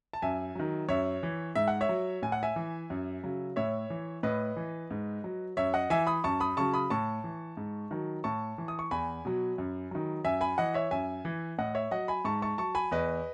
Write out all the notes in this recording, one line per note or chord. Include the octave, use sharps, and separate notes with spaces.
A5
F#2 E5 G#5
D#3 F#3
F#2 C#5 E5
E3
G#2 E5
F#5
C#5 E5
F#3
A2 G#5
F#5
E5 G#5
E3
F#2
C#3 F#3
A2 C#5 E5
E3
A2 B4 D#5
E3
G#2
F#3
F#2 C#5 E5
D#5 F#5
E3 E5 G#5
B5 D#6
F#2 A5 C#6
B5 D#6
C#3 F#3 A5 C#6
B5 D#6
A2 A5 C#6
E3
G#2
D#3 F#3
A2 A5 C#6
E3
D#6
C#6
E2 G#5 B5
B2 F#3
F#2
D#3 F#3
F#2 E5 G#5
G#5 B5
E3 D#5 F#5
C#5 E5
F#2 E5 G#5
E3
A2 D#5 F#5
C#5 E5
F#3 D#5 F#5
G#5 B5
G#2 A5 C#6
A5 C#6
F#3 A5 C#6
G#5 B5
E2 B4 D#5